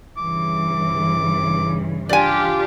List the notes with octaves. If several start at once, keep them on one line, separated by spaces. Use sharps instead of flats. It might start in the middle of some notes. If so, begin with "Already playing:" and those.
G2 C#3 E3 D6
D4 F4 G4 D5 G#5